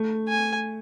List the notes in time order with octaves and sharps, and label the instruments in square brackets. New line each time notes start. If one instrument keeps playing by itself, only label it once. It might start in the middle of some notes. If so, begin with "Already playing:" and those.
Already playing: [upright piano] A3
[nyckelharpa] G#5